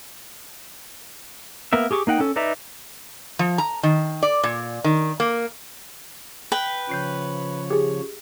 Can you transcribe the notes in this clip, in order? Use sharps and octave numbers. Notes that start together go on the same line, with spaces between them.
A#3 B3 A#4 E5
G4 G#4 C#6 D6
A#3 D#4 F#5 G5
C#4 A4
D#4 B4 D5 E5 A#5
F3
A#5
D#3
D5
A#2
D#3
A#3
B4 G5
C#3 F3 C#5 G6 C7 D7
G4 G#4